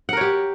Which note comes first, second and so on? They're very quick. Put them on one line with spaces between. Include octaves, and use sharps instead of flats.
F#5 A#4 C#5 G4